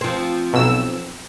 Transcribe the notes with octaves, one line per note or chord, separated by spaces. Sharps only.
F3 C4
B1 E6